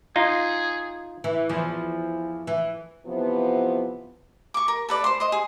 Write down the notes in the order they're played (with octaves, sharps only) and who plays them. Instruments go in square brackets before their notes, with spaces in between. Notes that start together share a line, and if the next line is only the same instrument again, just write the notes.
[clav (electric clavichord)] D#4 F4 [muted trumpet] G#4
[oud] E3
E2 E3 F3
E3
[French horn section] C3 E3 F3 B3
[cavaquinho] C#6 D6
A#4
A4 B4 D5
C5 C6
C5 D#5
G#4